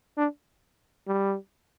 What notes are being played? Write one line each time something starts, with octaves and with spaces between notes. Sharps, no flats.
D4
G3